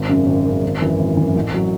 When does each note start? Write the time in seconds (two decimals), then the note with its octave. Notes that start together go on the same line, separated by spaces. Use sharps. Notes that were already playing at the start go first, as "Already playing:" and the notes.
Already playing: G#1
0.09 F#2 C#3
0.26 G#1
0.45 F#2 C#3
0.63 G#1
0.81 F#2 E3
0.99 G#1
1.17 F#2 E3
1.35 A1
1.54 F#3